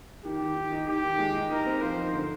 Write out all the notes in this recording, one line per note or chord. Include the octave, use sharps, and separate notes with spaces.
D#3 G4
D#3
D#3
D#4
D#3 G4
D#3
G#3
D#4
D#4 A#4
C4
F3 C5
D#4
D3